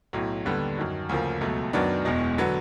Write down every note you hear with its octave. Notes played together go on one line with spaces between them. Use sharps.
B1 A2 F#3
D#2 D3 G3 B3
F#2 D#3 F#3
D2 C#3 F3 A#3
C#2 B2 F#3 A3
F#2 D#3 F#3 B3 D4
E1 E2 B2 G#3
D3 F#3 B3